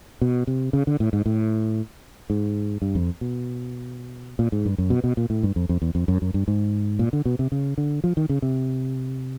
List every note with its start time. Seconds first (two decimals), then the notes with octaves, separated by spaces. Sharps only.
0.21 B2
0.47 C3
0.73 C#3
0.87 D3
1.00 A2
1.13 G#2
1.26 A2
2.30 G#2
2.82 G2
2.95 F2
3.21 B2
4.39 A#2
4.52 G#2
4.65 G2
4.78 F#2
4.90 B2
5.04 B2
5.17 A#2
5.30 A2
5.43 G2
5.56 F2
5.69 F2
5.82 E2
5.95 F2
6.08 F#2
6.22 F#2
6.34 G2
6.48 G#2
6.99 A#2
7.13 D3
7.25 B2
7.39 C3
7.52 C#3
7.78 D3
8.04 F3
8.17 D#3
8.29 C#3
8.42 C3